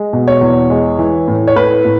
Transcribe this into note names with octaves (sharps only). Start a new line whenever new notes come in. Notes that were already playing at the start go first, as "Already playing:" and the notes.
Already playing: G#3
B2
C#5
E2
G#3
E3
A2
C#5
A2 B4
A2